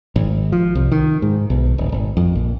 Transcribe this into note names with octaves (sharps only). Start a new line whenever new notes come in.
G#1
F3
C2
D#3
G#2
B1
D#1
G#1
F2
A#1